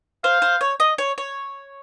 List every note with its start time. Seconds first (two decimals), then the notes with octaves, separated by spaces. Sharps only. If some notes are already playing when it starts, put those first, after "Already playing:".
0.24 C5 F5
0.42 C5
0.61 C#5
0.80 D#5
0.98 C#5
1.18 C#5